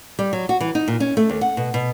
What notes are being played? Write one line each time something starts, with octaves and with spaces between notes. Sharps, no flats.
G3
F#3
F#4
E3
D#4
A#2
C#4
A3
D#2
F#5
B2
B2